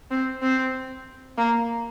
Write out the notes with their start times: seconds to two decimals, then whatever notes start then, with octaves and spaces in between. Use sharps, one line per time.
0.11 C4
0.42 C4
1.37 A#3